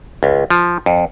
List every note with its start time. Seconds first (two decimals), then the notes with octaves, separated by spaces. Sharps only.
0.23 C#2
0.50 F3
0.86 F2